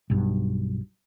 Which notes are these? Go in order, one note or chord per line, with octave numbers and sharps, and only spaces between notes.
B1 G2